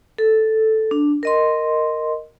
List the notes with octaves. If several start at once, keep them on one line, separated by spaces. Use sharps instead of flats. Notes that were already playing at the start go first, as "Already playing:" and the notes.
A4
D4
A#4 D#5 C6